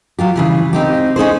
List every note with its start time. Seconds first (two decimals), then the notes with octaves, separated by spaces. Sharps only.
0.19 F#3 F4 G4
0.36 C#3 E3 G3
0.73 C4 D#4 G4
1.16 C#4 D#4 G#4 C5